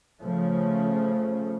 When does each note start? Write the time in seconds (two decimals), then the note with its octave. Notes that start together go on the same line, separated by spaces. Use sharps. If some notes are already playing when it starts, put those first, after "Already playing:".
0.20 C#3 F3 A3